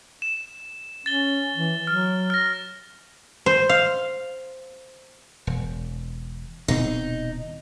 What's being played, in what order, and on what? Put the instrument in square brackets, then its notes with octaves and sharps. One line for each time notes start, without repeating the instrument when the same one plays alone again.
[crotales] E7
[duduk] C#4 [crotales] A6 G7
[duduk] E3
[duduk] F#3 [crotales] F6
[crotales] F6 A#6
[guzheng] C5
F5
[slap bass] E1
[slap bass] D#1 B2 C4 [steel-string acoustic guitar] D#4